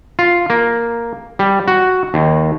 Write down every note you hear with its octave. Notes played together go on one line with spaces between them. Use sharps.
F4
A#3
G3
F#4
D#2